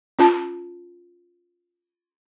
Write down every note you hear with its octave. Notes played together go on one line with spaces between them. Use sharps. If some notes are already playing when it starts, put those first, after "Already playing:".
C#4 F4 A5